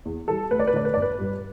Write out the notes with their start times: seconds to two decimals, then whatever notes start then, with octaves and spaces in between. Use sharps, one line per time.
0.05 E2
0.28 E3 G3 A4
0.51 D2 B4
0.59 D5
0.67 B4
0.73 D3 A3 D5
0.85 B4
0.94 G1 D5
1.02 B4
1.18 G2 G3